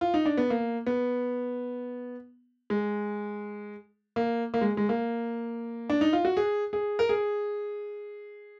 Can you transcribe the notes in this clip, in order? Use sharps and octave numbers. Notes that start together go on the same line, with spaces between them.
F4
D#4
D4
B3
A#3
B3
G#3
A#3
A#3
G#3
G#3
A#3
D4
D#4
F4
F#4
G#4
G#4
A#4
G#4